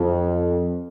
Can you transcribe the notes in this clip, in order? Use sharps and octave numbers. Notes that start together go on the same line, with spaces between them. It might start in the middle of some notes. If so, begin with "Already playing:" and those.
Already playing: F2